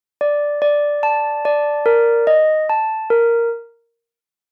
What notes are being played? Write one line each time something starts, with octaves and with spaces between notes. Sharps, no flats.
D5
D5
A5
D5
A#4
D#5
A5
A#4